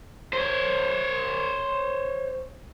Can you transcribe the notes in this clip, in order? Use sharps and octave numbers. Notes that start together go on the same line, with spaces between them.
C5 C#5